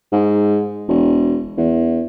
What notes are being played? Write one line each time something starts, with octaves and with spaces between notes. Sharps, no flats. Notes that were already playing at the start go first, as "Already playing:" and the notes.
G#2
E1
E2